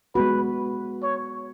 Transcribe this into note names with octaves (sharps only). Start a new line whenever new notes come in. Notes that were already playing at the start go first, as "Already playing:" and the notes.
G#3 B3 F#4 B4
C#5